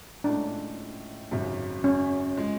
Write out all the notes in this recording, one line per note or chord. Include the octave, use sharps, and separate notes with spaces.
A2 F3 G#3 C#4 D4
G#1 F#2 C#3 F#3
C#4
F3 G#3